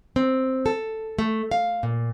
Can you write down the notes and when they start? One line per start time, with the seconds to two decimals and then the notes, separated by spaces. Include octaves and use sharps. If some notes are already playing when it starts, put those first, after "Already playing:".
0.16 C4
0.66 A4
1.19 A3
1.51 F5
1.83 A#2